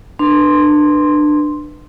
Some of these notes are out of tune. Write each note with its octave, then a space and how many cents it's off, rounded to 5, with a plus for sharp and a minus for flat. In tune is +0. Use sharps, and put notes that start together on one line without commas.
D4 +25 B4 +0 C6 +0